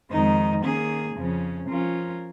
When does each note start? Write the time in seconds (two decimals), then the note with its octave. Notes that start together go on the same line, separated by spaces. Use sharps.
0.11 F2 D#3 G#3 D#4
0.63 D#3 A#3 C#4 G#4
1.16 F2 C#3 F3 C#4
1.69 F3 C#4 F4 A#4